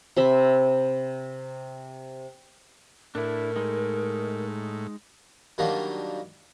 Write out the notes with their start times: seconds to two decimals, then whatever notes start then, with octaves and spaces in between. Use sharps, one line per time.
0.17 C3 C5 E5 B5
3.15 A2 D4 E4 A#4
3.56 G#3 D#4
5.58 D#3 F#3 G3 A#3 D4